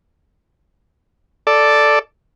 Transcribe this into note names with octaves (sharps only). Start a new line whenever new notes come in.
A4 D5